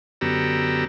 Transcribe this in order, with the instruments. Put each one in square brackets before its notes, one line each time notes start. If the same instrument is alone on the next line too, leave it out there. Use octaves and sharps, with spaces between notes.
[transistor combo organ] F#2 D3 B3 G4 A#5 E6